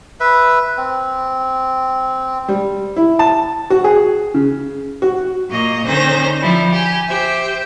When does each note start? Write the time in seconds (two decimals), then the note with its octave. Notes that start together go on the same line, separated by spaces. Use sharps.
0.20 B4 E5
0.78 C4
2.48 G3
2.96 E4
3.19 A5
3.70 F#4
3.84 G#4
4.34 C#3
5.02 F#4
5.49 A#2 A#3 D#5 C#6
5.85 D3 D#3 C#4 D#4 C5 A#6
6.41 F3 G3 E4
6.71 G4 G#5
7.07 G4 C5 E5